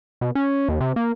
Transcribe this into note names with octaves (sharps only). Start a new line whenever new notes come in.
B2
C#4
D#2
C3
A#3